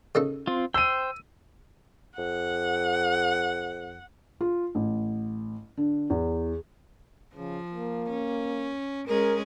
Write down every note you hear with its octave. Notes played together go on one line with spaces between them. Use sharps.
C#3 D#4 A4
C4 F4
C5 G5 E6 D#7
F2 F#5
F4
A1
D3
E2
C#3 F3
A#3
C#4
G#3 C#4 G#4 A#4